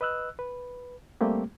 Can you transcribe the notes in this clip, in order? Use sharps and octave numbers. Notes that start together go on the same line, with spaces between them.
B4 D#5 E6 F#6
B4
G3 A3 A#3 C4 G4